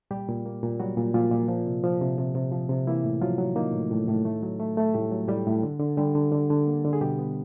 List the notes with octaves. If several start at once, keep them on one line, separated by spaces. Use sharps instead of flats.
A#2 G3 G4
A#2
A#3
A#2
F#3 G3 F#4
A#2
A#2 F3 F4
A#2
F3
C3
F3
C3
C3
C3
F3
C3
E3 A#3 E4
A2
F3 F#3 F4
F#3
D#3 A#3 D#4
A2
A2
A2
A3
F#3
A3
A3
A2 G3 G4
F#3
A2 G3 G4
A2
D3
D3
D3 G3 G4
D3
D3
D3
A#3
D3
G#4
B2 G3 G4
B3